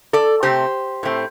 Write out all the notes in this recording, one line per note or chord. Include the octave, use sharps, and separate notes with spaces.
A4 D5
C3 A3 C4 G4 C5
A2 A3 C4